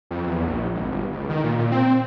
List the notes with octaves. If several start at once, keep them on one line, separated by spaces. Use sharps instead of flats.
F2
E2
A#1
G#1
G1
C#2
D#3
A#2
A#2
C4